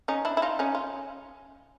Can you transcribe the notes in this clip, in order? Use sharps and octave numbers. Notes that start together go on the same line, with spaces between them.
C#4 D#4
D4 E4
E4
D#4 F4
C#4 D#4
F4